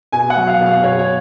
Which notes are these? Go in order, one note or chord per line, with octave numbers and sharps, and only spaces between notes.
B2 G#5
F#5
F#3
F5
B2
F5
B2 C#5
C#5